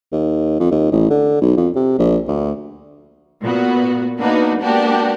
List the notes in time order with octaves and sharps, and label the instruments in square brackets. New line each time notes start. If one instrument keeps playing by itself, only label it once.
[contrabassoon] D#2
F2
D#2
A1
D3
B1
F2
C3
A#1
D2
[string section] A#2 B3 F#4
A#3 B3 D4 D#4 F#4 B4
G#3 A#3 B3 D4 F#4 G4